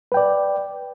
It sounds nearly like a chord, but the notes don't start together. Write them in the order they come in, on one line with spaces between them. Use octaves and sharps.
B4 G5 D5